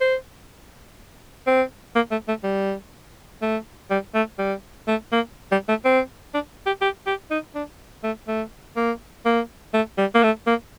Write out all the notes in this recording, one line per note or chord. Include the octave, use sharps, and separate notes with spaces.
C5
C4
A#3
A3
A3
G3
A3
G3
A3
G3
A3
A#3
G3
A3
C4
D4
G4
G4
G4
D#4
D4
A3
A3
A#3
A#3
A3
G3
A#3
A3
A#3